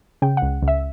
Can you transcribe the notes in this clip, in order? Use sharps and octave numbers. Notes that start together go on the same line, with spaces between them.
C#3 G5
F#5
C#2
C#2
E5